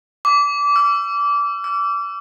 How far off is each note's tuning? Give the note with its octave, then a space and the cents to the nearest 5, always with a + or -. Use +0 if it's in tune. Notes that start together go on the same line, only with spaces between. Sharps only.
D6 -25
E6 +40
E6 +40